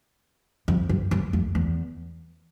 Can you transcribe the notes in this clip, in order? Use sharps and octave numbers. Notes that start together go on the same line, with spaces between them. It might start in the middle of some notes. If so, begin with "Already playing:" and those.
F2
F#2
F#2
F2
E2